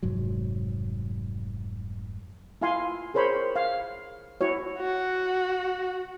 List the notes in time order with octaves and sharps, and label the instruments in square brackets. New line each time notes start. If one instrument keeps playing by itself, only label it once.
[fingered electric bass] F1 G#2 F#3
[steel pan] E4 F4 F5 G#5 C6
G#4 A#4 C5 C#5 B5
F5
E4 F#4 C#5
[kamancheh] F#4